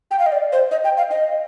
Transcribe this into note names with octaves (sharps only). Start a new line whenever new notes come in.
G5
F5
D#5
D5
C5
D#5
G5
F5
D#5